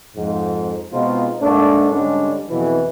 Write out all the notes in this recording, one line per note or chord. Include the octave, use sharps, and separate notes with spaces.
F2 G#2
B2 G#3 C4 D#4 F4
G#2 A3 A#3 D4
G#2 D3 G3 G#3 C#4 D4
F2 B2 E3